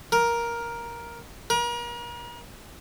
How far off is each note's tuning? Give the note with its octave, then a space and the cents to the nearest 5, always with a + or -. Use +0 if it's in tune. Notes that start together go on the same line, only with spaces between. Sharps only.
A#4 +10
A#4 +40